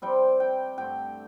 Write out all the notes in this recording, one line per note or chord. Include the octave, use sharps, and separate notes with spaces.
C3 G3 C4 G5
G5
G2 D3 A3 G5